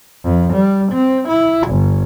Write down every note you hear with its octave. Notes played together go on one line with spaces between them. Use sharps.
F2
G3
C4
E4
G1